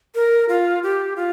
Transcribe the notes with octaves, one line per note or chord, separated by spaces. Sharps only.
A#4
F4
G4
F4